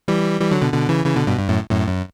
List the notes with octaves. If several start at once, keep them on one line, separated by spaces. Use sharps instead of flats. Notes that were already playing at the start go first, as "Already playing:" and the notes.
E3 G3
E3 G3
D3 F#3
B2 D3
B2 D3
C#3 E3
C#3 E3
B2 D3
G2 B2
G2
F#2 A2
F#2 A2
F#2